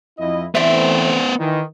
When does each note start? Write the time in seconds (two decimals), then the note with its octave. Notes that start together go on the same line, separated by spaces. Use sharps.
0.18 F2 E4 D#5
0.55 E3 A3 B3 C4 C5 D5 E5
1.38 D#3 E3